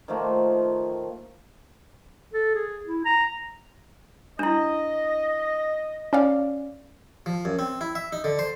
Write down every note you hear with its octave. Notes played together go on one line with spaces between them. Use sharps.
D#3 F3 A3 A#3
A4
G#4
E4
A#5
D4 E4 D#5
C#4 D5 F5
F3
F#2
C4
E4
E5
D#4
D3
C5